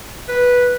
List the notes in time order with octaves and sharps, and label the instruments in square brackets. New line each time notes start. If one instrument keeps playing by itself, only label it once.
[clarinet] B4